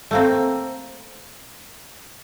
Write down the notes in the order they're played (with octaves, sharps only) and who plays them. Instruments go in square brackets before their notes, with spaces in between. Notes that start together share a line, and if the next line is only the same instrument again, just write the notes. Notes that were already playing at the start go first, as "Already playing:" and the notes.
[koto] A3 A#3 C4